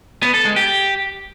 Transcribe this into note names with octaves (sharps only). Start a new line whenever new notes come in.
B3
A4
G#3
G4